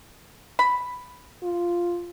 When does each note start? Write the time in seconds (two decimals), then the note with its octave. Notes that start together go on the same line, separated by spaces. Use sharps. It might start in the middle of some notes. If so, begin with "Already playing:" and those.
0.59 B5
1.43 F4